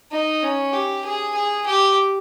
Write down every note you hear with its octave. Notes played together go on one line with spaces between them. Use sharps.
D#4
C#4
G4
G#4
G#4
G4